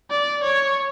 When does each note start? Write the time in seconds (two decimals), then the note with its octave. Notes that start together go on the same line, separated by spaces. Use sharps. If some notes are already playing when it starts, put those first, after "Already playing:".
0.10 D5
0.43 C#5